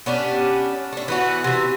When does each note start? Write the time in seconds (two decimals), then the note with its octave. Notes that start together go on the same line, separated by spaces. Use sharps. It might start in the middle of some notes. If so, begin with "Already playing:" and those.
0.06 B3 C#4 D4 G4
0.93 A3 D4
1.08 E3 B3 F#4
1.44 C3 E3